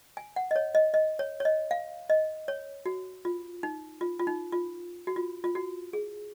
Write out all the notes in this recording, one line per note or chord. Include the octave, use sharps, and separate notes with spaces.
G#5
F#5
D#5
C#5
D#5
D#5
C#5
C#5
D#5
F5
D#5
C#5
F#4
F4
D#4
F4
F4
D#4
F4
F#4
F4
F4
F#4
G#4